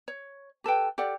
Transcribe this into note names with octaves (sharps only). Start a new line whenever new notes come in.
C#5
G4 A4 B4 G5
G4 A4 D5 F#5